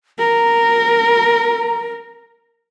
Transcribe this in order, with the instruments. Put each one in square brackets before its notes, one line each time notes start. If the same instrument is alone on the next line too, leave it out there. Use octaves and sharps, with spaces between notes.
[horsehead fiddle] A#4 [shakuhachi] A#5